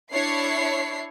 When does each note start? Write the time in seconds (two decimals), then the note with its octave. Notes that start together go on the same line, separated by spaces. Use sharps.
0.12 D4 E4 C#5 C7